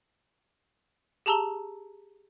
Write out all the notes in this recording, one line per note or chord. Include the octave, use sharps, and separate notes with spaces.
G4 G#4 A5 A#5 E6 G7